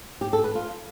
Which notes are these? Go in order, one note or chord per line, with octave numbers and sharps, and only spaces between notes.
G4
A4
B4
F4